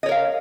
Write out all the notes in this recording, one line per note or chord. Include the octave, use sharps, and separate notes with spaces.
A#4 C#5 D#5 F5